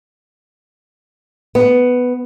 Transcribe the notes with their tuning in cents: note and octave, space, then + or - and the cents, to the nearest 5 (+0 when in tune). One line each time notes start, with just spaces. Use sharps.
B3 +5